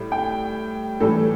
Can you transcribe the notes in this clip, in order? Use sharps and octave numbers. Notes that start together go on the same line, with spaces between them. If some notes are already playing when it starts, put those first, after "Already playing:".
Already playing: A2 G3
G5
A2 E3 G3 A4